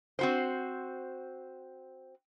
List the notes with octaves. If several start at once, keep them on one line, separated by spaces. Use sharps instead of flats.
C4 F#4 C5